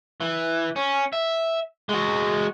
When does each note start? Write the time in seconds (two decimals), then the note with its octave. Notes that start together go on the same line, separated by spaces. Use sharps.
0.21 E3
0.76 C#4
1.13 E5
1.89 G#3 F#4